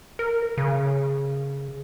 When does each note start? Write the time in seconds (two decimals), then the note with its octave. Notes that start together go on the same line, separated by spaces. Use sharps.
0.19 A#4
0.58 C#3